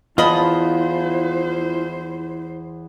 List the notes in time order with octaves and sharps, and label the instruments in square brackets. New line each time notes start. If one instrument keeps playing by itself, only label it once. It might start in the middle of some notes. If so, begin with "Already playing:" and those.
[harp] E2 [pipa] B3 D#5 B5 [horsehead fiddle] E4 C5 [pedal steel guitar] F4 A5